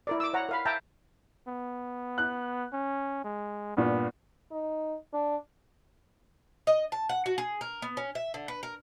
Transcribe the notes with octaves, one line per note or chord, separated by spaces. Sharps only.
E4 A#4 D5
D6 E6
C#5 F#5 A#5
A#4 F5 B5
E5 F5 G5 A5 A#5
B3
F#6
C#4
G#3
G2 A#2 B3
D#4
D4
D#5
A5
F#5
F#4
G#4
A#4
B3
C#4
E5
D3
B4
A#4